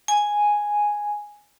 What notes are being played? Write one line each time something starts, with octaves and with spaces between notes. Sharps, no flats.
G#5